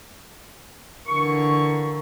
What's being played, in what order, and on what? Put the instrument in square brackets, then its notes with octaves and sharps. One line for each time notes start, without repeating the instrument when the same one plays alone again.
[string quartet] D3 E3 A#3 [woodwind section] C#6